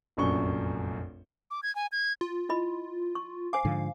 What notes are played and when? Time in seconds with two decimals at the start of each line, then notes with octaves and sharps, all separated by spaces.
0.17 F1 A#1 F#2 C#6 G7
1.51 D6
1.63 G#6
1.75 G#5
1.92 G#6
2.21 F4
2.49 E4 D#5 B5
3.15 C#6
3.53 C5 F5 G#5 D6
3.65 G#2 D3 F3